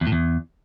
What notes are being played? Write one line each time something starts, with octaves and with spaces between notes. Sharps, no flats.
E2
A2
E2